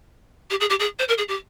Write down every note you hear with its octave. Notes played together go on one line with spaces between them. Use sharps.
G4
G#4
G4
G#4
C5
A#4
G#4
G4